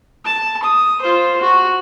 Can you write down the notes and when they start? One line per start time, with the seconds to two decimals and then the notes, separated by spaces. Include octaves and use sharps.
0.24 A5
0.63 D#6
1.01 F4 C5
1.41 F#4